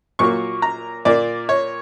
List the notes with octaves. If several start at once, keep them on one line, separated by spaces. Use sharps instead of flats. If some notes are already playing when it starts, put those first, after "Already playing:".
A#2 F#3 A#3 C#6
A#5
A#2 A#3 D5
C#5